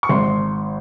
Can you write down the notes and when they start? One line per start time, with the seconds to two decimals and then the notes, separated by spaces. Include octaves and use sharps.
0.03 C#6
0.09 G#1 C6